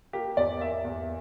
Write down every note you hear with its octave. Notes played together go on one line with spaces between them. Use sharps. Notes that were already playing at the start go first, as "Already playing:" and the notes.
A#3 G4
E2 D5
A#3 E5
E2